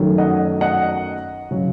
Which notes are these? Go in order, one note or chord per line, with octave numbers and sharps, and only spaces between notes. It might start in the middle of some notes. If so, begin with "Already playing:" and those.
Already playing: F#2 D#3 F#3 A3
D#5 F#5
D#5 F#5
C#3 F#3